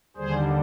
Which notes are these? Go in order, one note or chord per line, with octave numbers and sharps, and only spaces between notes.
D#2 D3 G3 G#4 C5